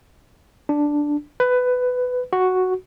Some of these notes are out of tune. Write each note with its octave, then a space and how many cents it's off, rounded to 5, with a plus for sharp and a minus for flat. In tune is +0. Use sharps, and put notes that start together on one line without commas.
D4 +0
B4 +15
F#4 +0